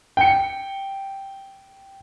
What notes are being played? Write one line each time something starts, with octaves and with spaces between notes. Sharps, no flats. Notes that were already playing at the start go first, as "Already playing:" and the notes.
G5 C#7